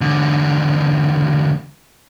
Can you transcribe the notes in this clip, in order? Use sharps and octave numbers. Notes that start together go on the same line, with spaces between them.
E2 D3